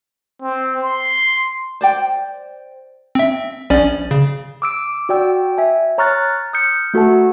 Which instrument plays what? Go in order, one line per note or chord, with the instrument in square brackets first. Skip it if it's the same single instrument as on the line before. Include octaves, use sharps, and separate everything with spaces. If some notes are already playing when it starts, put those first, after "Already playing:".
[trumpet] C4
C6
[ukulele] C5 D5 G5
[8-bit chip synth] C4 E5
A#1 C#4 D5
C#3
[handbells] D6 E6 D7
F#4 D5 G5 E6
E5 G#5
C#5 A#5 C#6 F6 F#6 A6
D#6 F6 G6 C#7
A3 F#4 A4 F#5 A5